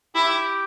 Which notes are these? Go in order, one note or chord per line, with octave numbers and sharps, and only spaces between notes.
E4 G4